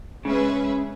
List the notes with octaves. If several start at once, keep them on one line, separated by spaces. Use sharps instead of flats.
C#3 G#3 C#4 G#4 B4 E5